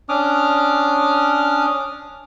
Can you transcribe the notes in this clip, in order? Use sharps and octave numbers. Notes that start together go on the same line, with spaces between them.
C#4 D4 D6 D#6 F6